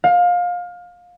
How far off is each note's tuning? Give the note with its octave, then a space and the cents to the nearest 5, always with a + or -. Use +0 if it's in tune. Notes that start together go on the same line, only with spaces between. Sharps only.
F5 +25